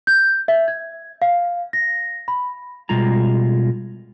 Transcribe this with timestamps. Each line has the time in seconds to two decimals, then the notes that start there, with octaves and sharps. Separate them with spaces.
0.07 G6
0.48 E5
0.68 G#6
1.22 F5
1.73 A#6
2.28 B5
2.89 B2 G3 G#3 F4 A#5